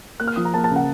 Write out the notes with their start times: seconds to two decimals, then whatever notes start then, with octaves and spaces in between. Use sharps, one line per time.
0.20 A#3 F#6
0.28 F6
0.36 F3 D#6
0.45 A#5
0.53 A#3 A5
0.64 A5
0.70 C#3
0.76 F#5